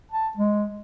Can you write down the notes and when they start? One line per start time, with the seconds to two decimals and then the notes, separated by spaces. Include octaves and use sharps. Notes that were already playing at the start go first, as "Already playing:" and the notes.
0.12 A5
0.37 G#3